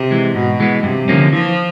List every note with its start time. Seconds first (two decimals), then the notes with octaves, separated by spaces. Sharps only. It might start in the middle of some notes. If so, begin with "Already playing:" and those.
Already playing: C3
0.11 E3 G#3
0.34 G#2 B2
0.60 E3 G#3 B3
0.83 G2 C3
1.08 D3 F3 A#3 C#4
1.33 E3 F3